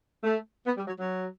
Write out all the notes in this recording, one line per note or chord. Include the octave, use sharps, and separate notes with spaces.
A3
B3
G3
F#3
F#3